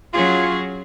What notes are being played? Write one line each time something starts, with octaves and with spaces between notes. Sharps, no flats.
F#3 C#4 F4 G#4